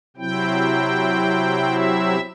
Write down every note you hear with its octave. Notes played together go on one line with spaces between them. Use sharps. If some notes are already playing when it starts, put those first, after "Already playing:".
C3 F#3 C4 E4 G5
E5